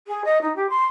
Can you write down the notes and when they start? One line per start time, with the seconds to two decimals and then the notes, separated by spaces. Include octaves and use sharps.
0.08 G#4
0.25 D#5
0.41 D#4
0.56 G4
0.70 C6